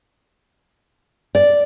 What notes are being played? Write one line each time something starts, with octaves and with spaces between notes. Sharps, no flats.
D5